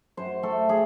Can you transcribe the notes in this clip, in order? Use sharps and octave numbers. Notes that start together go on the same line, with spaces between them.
F#2 C5
A3 A4
G#4